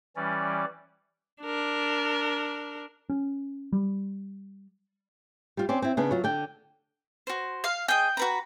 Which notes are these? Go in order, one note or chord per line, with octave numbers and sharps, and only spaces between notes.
E3 G3 C#4 D5
D4 A#4
C#4
G3
G3 F4
C4 C#4 D5
C4 E4
C#3 B3 D4
F#3 F4
D3 D5 G5
F#4 C5
F5
G#4 D#5 G5
F#4 B4 A#5